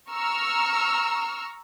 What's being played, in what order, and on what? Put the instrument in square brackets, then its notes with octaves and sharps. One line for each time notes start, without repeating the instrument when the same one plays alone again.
[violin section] A#5 C#6 E6 F6